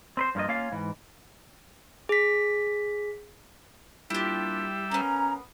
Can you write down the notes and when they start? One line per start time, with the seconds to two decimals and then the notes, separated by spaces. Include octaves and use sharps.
0.17 C4 B4 C5
0.35 G2 F3 A#3 F4 D#5
0.48 A#3 C#4 F4 F5
0.72 G#2 E3
2.09 G#4 B6
4.10 G3 A#3 D4 E4 F4 G4 E5
4.91 A#3 B3 C#4 A#5